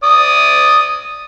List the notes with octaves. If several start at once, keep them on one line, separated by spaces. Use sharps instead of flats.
D5 D#6